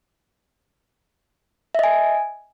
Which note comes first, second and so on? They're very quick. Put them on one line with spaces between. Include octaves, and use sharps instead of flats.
E5 D#5 G#5